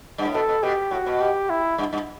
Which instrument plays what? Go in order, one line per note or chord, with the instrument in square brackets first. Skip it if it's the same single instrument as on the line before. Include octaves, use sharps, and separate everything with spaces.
[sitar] G2
A2
[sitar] B2 [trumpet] A4
[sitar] B2
[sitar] B2 [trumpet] G4
[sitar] A2 [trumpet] F#4
[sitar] B2
[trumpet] G4
E4
[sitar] G2
G2